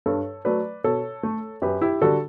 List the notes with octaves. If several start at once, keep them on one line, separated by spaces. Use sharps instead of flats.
G2 A4 C#5
F#3 A3 B4 D5
B2 A4 C#5
A3
F#2 G4 B4
E4 G4
D3 G3 F#4 A4